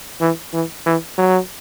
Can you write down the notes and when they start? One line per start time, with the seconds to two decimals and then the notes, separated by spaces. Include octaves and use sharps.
0.21 E3
0.53 E3
0.86 E3
1.18 F#3